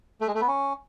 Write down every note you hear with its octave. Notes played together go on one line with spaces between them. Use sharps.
A3
G#3
A3
B3
C#4